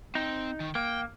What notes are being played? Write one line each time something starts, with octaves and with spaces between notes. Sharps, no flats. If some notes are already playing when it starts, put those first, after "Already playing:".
C4 D#4
D#3
A#3 G5